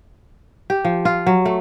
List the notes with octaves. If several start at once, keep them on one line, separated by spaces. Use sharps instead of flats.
G4
F3
F4
F#3
A3